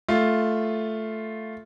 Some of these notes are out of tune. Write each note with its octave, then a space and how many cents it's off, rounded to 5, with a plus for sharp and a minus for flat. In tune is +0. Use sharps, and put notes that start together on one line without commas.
A3 +0 F4 +0